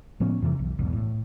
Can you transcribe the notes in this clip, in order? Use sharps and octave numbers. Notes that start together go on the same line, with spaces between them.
A2 F3 B3 C#4
F2 C3 E3 F3
B1
B1 E2 G#2 B2
A2